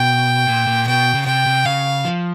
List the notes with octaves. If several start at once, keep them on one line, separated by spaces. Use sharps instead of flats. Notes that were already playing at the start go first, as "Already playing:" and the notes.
Already playing: B2 G5
A#2
A#2
B2 G5
C#3
C3 G5
C3
C#3 F5
F3